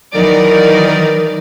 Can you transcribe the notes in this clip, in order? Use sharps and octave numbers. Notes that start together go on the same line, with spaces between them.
D#3 E3 F#3 D#4 A#4 D5